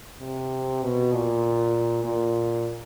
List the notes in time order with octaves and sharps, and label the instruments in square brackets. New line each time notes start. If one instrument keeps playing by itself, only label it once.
[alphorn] C3
B2
A#2
A#2